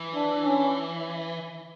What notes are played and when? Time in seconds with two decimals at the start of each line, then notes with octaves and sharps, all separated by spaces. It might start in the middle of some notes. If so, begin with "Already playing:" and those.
Already playing: E3
0.15 D4
0.45 C#4